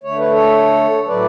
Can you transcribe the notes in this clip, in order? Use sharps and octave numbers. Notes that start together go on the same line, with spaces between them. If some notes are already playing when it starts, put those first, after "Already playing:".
D3 A3 C#5
B4
A4 C#5
A2 F#3 A3 B4 D5